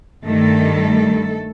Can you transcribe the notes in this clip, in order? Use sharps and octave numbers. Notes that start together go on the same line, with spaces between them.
G2 D#3 G3 A3 A4